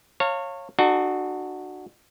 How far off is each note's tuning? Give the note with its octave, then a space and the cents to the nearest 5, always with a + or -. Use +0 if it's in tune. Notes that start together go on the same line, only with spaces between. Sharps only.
C#5 -15 F5 +0 A5 +45
D4 +40 F#4 +0 A4 -45